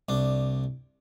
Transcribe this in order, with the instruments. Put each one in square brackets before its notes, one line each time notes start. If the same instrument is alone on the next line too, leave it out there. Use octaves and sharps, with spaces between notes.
[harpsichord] C2 D4